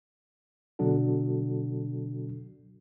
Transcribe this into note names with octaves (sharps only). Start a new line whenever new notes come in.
B2 D3 F#3 D4 F#4 A4